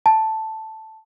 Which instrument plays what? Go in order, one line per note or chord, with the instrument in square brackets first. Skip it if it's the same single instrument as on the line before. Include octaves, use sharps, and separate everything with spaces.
[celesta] A5